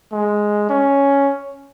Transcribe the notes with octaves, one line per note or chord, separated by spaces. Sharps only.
G#3
C#4